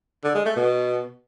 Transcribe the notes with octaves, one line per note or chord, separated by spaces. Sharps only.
D3
G#3
A3
B2